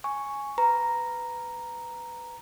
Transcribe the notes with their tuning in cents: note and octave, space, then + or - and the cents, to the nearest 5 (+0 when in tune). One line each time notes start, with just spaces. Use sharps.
G#5 +0 C#6 +0
B4 +15 A#5 +0